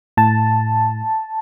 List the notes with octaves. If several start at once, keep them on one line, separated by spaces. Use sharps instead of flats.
A2 A5